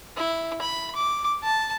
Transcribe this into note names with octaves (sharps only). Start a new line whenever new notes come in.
E4
B5
D6
A5